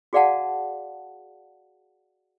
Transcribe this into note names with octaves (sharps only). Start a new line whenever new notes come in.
F#4 G#4 D5 F5 F#5 A5